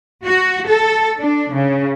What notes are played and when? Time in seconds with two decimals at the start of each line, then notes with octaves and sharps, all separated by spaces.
0.25 F#4
0.68 A4
1.20 D4
1.53 C#3